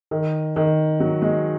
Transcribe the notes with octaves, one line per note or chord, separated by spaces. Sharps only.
D#3
D#3
F#3
G#3